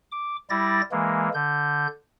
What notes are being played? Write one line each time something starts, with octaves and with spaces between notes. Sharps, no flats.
D6
G3 E4 D5 A6 A#6
E3 G#3 A#3
D3 G6